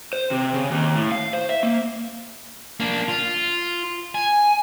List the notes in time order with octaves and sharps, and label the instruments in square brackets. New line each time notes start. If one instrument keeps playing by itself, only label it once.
[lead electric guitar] C5
C3
C#3
D#2
A2
F5
C5
E5
A#3
[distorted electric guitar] A#3 D4
F4
G#5